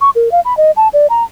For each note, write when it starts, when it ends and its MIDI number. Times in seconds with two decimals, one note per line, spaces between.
0.01 0.10 85
0.15 0.31 70
0.32 0.40 77
0.45 0.56 83
0.57 0.71 75
0.76 0.88 81
0.93 1.07 74
1.10 1.24 82